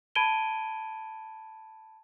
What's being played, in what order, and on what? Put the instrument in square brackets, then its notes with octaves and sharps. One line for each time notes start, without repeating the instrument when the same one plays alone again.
[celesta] A5 B5 G#6 D7 D#7 G7